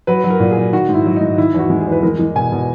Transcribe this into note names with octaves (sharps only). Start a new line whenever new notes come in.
F#3 B4
F#3
A#4
A#2
G#4
A#2
D#3 F#4
G#2
E4
F#3
G#2 D#4
D#3 E4
E2 F#4
G#3
G#4
E2 B4
G#3 A#4
G#3
B2 G#5
B2